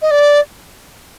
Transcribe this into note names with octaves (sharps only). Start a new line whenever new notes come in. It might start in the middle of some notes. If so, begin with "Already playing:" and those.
D#5
D5